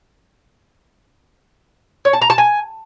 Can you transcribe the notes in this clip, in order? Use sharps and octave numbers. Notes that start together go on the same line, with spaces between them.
C#5
A5
A#5
A5
G#5